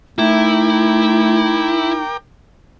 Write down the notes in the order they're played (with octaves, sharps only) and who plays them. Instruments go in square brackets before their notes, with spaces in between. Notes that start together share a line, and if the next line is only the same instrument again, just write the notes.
[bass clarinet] A3 [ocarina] D#4 [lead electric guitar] E4 [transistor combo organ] A#4 G5 D6